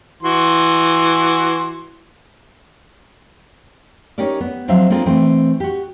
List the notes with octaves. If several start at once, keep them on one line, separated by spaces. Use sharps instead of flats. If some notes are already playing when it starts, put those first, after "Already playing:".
E3 F#4 C6
C#4 D#4 G4 A#4 D5
B3
F3 F#3 C4 C5 E5 F5
A#3 C4 D4 F4 G#4 A4
E3 A3 C4
F#4 G4